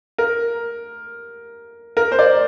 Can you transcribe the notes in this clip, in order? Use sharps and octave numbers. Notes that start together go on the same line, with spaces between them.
A#4
A#4
C5
D5